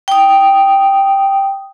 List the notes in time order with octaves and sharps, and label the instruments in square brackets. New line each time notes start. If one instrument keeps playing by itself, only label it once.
[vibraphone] G5 D#6